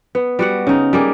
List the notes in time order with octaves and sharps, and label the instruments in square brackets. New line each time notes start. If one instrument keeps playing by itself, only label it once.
[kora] B3
G3 F#4 F#5
C#3 D#4
G3 A#3 G#4